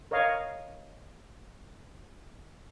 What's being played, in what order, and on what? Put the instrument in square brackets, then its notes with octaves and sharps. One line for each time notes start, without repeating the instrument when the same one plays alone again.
[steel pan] A#4 C#5 D#5 F5